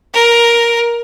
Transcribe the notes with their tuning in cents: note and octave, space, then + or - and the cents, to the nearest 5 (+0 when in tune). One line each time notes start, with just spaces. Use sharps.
A#4 +10